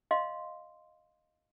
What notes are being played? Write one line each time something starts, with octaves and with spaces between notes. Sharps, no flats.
D#5 F5 C6